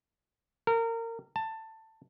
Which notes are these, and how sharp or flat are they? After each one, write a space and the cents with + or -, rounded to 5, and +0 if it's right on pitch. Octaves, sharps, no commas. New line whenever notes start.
A#4 -25
A5 +15